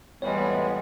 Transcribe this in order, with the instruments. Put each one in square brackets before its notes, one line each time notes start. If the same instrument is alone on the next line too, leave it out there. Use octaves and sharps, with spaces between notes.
[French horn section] F2 A2 B3 [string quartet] E3 G3 G#3 [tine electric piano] C#5